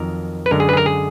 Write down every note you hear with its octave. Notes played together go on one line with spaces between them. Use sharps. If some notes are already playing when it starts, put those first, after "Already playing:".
Already playing: F2 D#3 F#3 A#4
B4
F#2 D3 G#3 A#4
G#4
B4
G#4
A#4
G#4